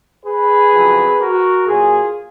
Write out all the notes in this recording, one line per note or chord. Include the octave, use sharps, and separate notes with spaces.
G#4 B4
F2 C#3 F#3
F#4 A#4
A#2 F#3 A#3 F4 G#4